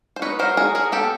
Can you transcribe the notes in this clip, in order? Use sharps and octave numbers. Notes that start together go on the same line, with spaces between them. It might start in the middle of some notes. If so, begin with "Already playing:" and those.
C5
D#4 B4 C#5
F#3 A#4 C5
F#3 G#4 A#4
F#3 G#4 A#4
B3 G4 A4